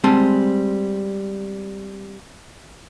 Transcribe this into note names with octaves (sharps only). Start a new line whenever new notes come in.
G3 G#3 C4 G#5 A5